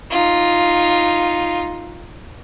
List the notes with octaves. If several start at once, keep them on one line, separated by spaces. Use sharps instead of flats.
D#4 F4